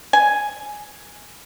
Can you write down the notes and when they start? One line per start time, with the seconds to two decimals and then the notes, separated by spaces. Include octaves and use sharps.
0.13 G#5